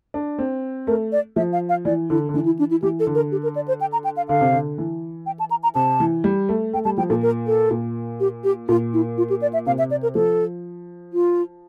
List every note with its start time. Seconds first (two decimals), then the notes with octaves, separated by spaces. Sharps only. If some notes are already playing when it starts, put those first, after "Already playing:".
0.14 D4
0.39 C4
0.87 A3 A#4
1.12 D5
1.36 F3 E5
1.53 F5
1.69 F5
1.85 E3 D5
2.10 D3 E4
2.29 D3
2.34 E3 D4
2.46 E4
2.59 D4
2.71 E4
2.82 E3 G4
3.00 A4
3.07 D3
3.15 A#4
3.32 G4
3.43 A#4
3.56 D5
3.68 C5
3.81 G5
3.92 A#5
4.04 G5
4.17 F5
4.29 D3 F5
4.41 C3
4.52 D3
4.78 E3
5.26 G5
5.40 A5
5.51 A#5
5.63 A#5
5.75 C3 A5
6.00 E3
6.24 G3
6.49 A3
6.73 A3 G5
6.85 G3 A5
6.98 F3 G5
7.09 A#2 A4
7.23 A#4
7.47 A4
7.71 A#2
8.20 G4
8.44 G4
8.68 A#2 F4
8.93 E4
9.18 F4
9.30 G4
9.42 D5
9.53 E5
9.66 C3 F5
9.78 E5
9.91 D5
10.03 A#4
10.15 F3 A4
11.13 F4